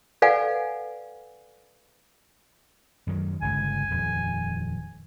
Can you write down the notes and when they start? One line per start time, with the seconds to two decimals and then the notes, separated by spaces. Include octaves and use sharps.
0.22 A4 B4 D5 F5 F#5 G#5
3.07 F#2 D#3 F#3
3.42 G1 C#2 G#5
3.91 D#1 F2